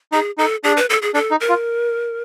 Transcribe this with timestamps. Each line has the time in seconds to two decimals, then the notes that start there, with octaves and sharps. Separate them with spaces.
0.12 D#4 G#4
0.38 D#4 A4
0.64 D4 G#4
0.77 B4
0.90 A4
1.02 G#4
1.14 D4 A4
1.31 D#4
1.40 A#4
1.49 F4